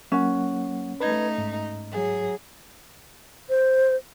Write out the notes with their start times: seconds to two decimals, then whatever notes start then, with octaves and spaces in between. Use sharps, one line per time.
0.12 F#3 A#3 C#4 F#5
1.00 A3 D#4 B4 G#6
1.38 G#2
1.91 F#3 G#4
3.50 C5